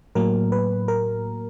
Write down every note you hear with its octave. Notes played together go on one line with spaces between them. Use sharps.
A2 F#3 A#3 A#4
B4
A#4